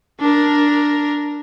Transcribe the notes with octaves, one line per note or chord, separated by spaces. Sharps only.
D4 A#4